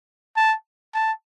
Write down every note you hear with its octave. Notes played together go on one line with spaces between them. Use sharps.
A5
A5